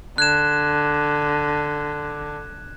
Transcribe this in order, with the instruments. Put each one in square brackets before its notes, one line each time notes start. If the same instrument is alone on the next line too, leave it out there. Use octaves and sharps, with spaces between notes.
[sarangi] D3 [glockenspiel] F#6 G#6 E7